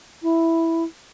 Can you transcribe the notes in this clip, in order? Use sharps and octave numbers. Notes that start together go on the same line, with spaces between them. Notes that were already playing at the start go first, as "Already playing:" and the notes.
E4